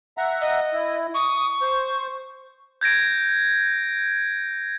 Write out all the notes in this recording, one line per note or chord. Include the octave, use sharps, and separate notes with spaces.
E5 F#5 A#5
D#5
E4
C#6 D#6
C5
G6 G#6 A#6 D7